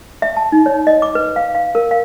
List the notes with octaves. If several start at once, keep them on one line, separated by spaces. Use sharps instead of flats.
E5
A5
D#4
C#5
D#5
D6
B4
F5
F5
A#4
F5